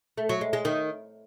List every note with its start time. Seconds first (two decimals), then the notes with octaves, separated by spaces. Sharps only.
0.18 A3
0.29 F#3
0.41 G#3
0.53 G#3
0.65 D#3